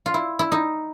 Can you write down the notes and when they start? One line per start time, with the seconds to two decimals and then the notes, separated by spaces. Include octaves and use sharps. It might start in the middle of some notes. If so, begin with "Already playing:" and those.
0.06 F4
0.14 E4
0.39 E4
0.52 D#4